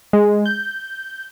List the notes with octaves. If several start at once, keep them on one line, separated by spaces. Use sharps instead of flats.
G#3
G6